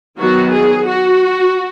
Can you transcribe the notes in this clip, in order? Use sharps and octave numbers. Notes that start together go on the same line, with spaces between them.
D#3 F#3 B3 F#4
G#4
F#4